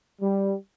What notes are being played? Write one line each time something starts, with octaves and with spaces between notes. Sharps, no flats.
G3